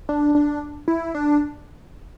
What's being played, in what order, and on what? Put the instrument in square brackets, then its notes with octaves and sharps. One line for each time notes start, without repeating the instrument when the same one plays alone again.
[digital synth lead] D4
D4
E4
D4